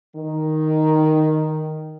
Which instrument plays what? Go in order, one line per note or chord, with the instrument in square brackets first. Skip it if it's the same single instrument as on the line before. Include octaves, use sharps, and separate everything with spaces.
[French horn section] D#3